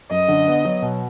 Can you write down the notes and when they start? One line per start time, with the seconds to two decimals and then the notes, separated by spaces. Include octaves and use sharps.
0.10 F#2 D#5
0.28 D3
0.47 B3
0.65 F#3
0.82 B2